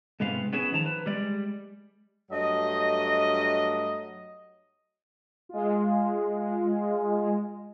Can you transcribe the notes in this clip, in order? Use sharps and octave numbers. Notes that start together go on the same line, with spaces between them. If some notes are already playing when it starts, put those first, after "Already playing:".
G#2 C3 G#3 B3 F5
B3 C#4 E4 G#4
D#3 F3 A5 A#5
B4
G3 G#3 D5
G2 F#3 A3 D#5
G#3 F4